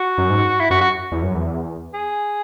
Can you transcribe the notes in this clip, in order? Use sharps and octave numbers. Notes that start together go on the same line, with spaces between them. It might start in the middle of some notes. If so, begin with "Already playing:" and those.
Already playing: F#4
F#2
G#2
E4
F#2 F#4
F#4
E2
F#2
E2
G#4